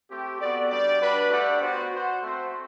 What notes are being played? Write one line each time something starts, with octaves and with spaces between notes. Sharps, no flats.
A3 C4 G4
B3 F#4 A4 D5
G3 D4 G4 D5
G3 D4 F#4 B4
A3 D4 G4 D5 F#5
B3 F#4 C5
F#4 C5 F#5
A3 C4 F#4 C5